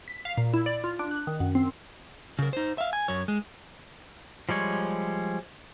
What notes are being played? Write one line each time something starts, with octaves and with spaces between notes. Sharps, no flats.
B6
F5
A#2
E4
D5
F4
D4
F#6
D#3
F#2
C4
C#3 A#4
D#4 C5
E5 F5
G#5
F#2 C#5
G#3
F3 G3 G#3 C#5